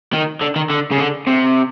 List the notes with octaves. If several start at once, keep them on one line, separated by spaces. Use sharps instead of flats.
D#3
D3
D#3
D3
C#3
D3
C3